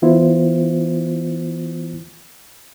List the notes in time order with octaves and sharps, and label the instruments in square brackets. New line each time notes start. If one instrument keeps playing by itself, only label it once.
[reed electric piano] E3 B3 E4 F4 C5